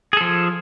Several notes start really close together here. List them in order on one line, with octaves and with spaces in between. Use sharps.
G#4 A4 F3